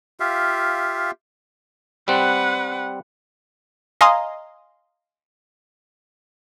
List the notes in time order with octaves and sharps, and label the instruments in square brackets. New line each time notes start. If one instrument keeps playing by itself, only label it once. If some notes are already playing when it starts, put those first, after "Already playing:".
[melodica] F4 G4 E5 F5
[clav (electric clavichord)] G3 C4 [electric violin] B4 F#5
[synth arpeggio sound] D#5 F5 G#5 A#5 C6 D#6